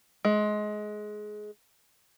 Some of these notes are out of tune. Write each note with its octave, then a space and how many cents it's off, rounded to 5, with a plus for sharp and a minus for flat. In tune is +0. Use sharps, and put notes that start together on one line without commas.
G#3 +20